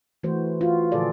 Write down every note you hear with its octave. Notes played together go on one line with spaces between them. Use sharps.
E3 A3 F#4 C5
F4 F#4
A#2 D3 F3 G#4 A4 D5